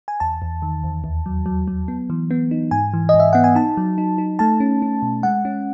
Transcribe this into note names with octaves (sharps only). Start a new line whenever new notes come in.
G#5
E2 A5
E2
D#3
E2
D#2
F#3
F#3
F#3
B3
E3
B3
D#4
G#2 G#5
E3
D#5
G#2
E5
B3 F#5
G#5
D#4 A5
F#3
D#4
D#4
A3 A5
C#4
C#4
B2
G#3 F#5
C#4